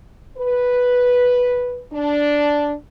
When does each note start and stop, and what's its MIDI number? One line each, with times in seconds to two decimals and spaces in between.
0.38 1.83 71
1.93 2.73 62